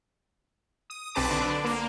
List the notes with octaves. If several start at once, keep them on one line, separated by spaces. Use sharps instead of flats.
D#6
B1 C4 B4 A5 D6
D3 D4
A#3